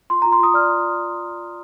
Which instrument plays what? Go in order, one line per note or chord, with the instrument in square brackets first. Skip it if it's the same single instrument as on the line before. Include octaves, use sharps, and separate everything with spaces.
[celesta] F4 C6
A#5
F4
C6
F4 D#6
D5 F6